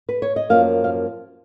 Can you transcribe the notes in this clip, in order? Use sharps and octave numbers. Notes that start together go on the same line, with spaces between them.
B4
C#5
D#5
F#2 F3 A#3 F5
F5